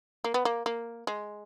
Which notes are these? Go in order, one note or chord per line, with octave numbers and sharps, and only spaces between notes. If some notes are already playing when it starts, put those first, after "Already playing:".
A#3
B3
A#3
A#3
G#3